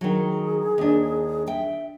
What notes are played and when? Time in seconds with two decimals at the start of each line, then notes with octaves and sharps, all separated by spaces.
0.01 D#3 F#3 G#4
0.78 D#2 D4
1.47 E5 G5